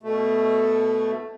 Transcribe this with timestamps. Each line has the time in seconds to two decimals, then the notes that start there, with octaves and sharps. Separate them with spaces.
0.03 B2 A3